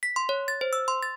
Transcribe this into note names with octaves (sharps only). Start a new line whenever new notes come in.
B6
C6
C#5
A6
C5
E6
C6
A6